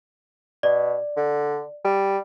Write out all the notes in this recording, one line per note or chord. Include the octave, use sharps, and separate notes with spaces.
B2 D5
D3
G3